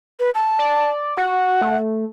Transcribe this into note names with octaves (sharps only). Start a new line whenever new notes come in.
B4
A5
D5
F#4 F#5
A3